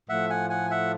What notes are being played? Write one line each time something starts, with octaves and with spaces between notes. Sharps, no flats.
A2 F3 A3 E5 F#5
F#5 G#5
F#5 G#5
E5 F#5